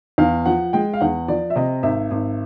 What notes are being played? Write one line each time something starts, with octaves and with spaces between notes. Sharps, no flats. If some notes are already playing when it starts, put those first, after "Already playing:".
E2 F5
F3 F#5
G#3 G5
F5
E2 F#5
F3 D5
E5
C3 D#5
G#1 E5
G#1